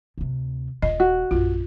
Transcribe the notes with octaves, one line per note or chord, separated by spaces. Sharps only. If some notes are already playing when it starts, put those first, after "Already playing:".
D2 C3
D#1 F4 D#5
F#4
A#1 F#2 F4